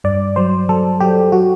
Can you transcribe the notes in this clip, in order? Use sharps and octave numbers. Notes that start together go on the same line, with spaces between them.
G2 D5
F#3 C5
F#3 A4
F#3 G4
F#3 F#4